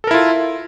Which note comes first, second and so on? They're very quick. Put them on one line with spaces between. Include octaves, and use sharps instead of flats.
A4 A#4 E4 F4